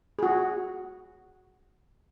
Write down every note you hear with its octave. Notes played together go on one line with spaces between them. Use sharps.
F#4 G#4